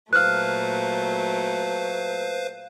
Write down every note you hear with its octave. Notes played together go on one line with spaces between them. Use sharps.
A#2 F#3 A3 B4 C5 F5 F6 F#6